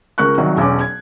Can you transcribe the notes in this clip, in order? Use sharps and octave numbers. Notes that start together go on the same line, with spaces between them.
C#2 A#4 C#6 F#6
C2 D#3 F#3
E1 B1 C#4 D6
G#6